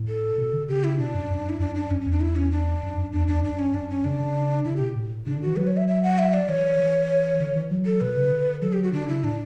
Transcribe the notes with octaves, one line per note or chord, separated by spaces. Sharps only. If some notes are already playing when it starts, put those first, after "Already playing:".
Already playing: A2
A4
B2
D3
C#3 G4
E4
B2 D4
F#2
F#2
E4
F#2 D4
D4
F#2 C#4
C#4
E2
D4
E4
C#4
D4
F#2
F#2
E2 D4
E2 D4
F#2 D4
C#4
F#2 D4
C#4
C#3 D4
C#3
C#3 E4
G4
B2
A2
C#3 D4
D3
E3 F#4
F#3 B4
C#5
E5
E5
F#5
E5
D5
E3 C#5
E3
D3
E3
F#3
A4
B2 B4
C#3
D3
F#3 A4
G4
F#4
D3 D4
C#3 E4
A2 D4